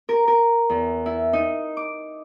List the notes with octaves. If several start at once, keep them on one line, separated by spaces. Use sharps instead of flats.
A#4
A#4
E2
E4
D#4
D6